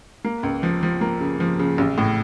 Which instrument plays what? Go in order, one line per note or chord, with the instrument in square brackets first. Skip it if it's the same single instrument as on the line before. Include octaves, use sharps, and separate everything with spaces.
[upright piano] A#3
C#2
F3
F3
A#3
C#3
F3
C#3
A1
A2